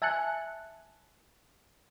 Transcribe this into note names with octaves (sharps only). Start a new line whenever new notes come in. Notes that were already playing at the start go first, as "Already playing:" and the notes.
E5 G#5 A5 F#6 C#7